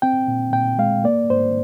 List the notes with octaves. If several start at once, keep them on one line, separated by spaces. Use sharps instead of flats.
C4 G5
A#2
A#2 G5
G#3 F5
A#3 D5
G#2 C5